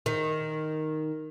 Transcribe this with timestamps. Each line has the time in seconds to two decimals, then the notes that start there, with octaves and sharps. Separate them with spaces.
0.06 D#3